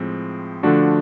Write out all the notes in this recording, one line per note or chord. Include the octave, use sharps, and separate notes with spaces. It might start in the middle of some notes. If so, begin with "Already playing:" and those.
Already playing: A2 F3 G#3 C4
D3 F3 A3 D4 F#4